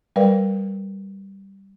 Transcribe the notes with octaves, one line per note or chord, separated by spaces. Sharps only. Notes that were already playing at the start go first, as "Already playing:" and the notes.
G3 A#4 B4 D5 F5